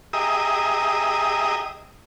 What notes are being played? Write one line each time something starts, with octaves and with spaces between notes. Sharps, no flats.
G4 G#4 D#5 E5 A#5 D#6